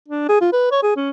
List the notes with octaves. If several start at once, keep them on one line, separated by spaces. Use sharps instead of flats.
D4
G#4
F4
B4
C#5
G#4
C#4